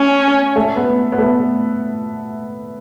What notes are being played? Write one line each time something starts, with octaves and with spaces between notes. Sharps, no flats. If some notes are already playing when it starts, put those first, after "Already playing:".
Already playing: A3 C#4
A3
B3
B3
A3